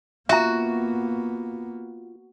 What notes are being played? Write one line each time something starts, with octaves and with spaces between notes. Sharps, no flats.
A#3 B3 F4 F#4 E5 A#5